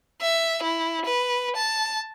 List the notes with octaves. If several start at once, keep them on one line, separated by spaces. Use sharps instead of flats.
E5
E4
B4
A5